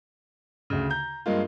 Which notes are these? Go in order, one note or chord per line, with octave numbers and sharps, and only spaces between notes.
D2 C#3
A#5 G6
G2 G#3 A#3 F4